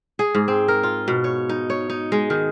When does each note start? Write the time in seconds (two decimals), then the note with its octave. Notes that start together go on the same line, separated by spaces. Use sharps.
0.19 G#4
0.35 G#2
0.48 C4
0.68 A#4
0.83 F4
1.08 B2
1.24 C#5
1.49 D#4
1.70 C#5
1.90 D#4
2.12 G#3
2.30 D#3